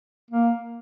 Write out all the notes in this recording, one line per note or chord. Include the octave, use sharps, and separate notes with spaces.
A#3